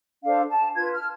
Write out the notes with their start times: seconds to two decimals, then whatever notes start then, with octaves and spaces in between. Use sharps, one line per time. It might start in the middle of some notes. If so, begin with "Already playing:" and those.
0.23 D4 A4 C5 F5
0.49 A5
0.75 F4 B4 G#6
0.92 F6